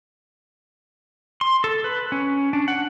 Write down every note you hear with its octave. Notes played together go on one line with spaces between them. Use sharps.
C6
A4
B4
C#4
D4
F#5